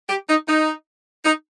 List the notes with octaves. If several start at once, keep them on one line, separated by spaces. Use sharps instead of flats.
G4
D#4
D#4
D#4